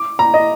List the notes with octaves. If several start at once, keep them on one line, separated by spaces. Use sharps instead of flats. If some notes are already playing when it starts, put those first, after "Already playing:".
Already playing: D6
A#5
D#5